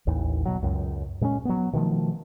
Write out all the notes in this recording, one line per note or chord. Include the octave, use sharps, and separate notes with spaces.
A1 D#2 E3
B2 F#3
C#2 F#2
A#2 G#3 B3 C#4
F#3 B3
B2 D#3 F3 A3